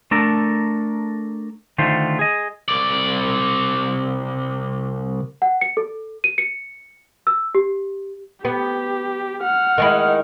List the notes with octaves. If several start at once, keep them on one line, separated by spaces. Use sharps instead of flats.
A3 D4 A4 A#4
D3 D#3 A3 F4 C5
G#4 D#5
C2 D5
F#5
C#7
A4
D#7
C#7
E6
G4
B3 G4
F#5 F6
D#3 G#3 E4